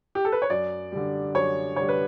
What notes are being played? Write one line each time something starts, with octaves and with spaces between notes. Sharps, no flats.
G4
A4
B4
C#5
F#2 D5
D3 G3
F#2 C#5
D3 G3 C#5
B4